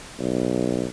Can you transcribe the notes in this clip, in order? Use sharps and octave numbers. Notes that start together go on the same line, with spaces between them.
B1